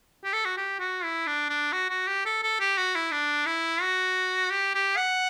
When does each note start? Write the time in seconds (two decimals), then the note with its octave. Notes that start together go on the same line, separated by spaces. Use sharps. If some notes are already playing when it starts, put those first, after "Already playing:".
0.24 G4
0.33 A4
0.45 F#4
0.57 G4
0.79 F#4
1.04 E4
1.27 D4
1.49 D4
1.72 F#4
1.89 F#4
2.08 G4
2.25 A4
2.43 A4
2.60 G4
2.78 F#4
2.95 E4
3.12 D4
3.46 E4
3.81 F#4
4.50 G4
4.75 G4
4.97 F#5